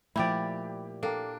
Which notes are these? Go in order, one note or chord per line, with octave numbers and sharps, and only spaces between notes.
A#2 F3 A3 E4 G4 D5 G5 B5
A#3 D4 A4 G5